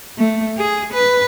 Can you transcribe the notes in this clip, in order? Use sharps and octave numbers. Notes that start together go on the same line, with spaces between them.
A3
G#4
B4